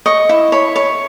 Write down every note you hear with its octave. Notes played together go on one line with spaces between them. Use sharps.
D#5 C#6
E4
C#5 B5
C#5